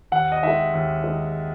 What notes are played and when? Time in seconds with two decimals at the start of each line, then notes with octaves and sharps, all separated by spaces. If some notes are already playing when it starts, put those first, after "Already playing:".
0.12 D#2 F#5
0.32 D#5
0.43 D#3 G#3 E5
0.74 D#2
1.04 D#3 G#3